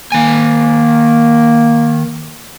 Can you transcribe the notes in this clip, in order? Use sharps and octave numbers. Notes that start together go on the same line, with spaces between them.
D#3 A#3 G#5